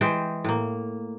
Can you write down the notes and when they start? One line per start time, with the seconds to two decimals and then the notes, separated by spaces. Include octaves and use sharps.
0.01 E3 G#3 C5 G5
0.44 A2 A#3